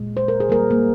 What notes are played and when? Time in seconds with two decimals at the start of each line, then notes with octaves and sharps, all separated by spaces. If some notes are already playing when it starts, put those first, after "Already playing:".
Already playing: A#2 G#3
0.17 C5
0.28 A#4
0.40 G#4
0.48 E3 G3 A#3 A#4
0.71 A#3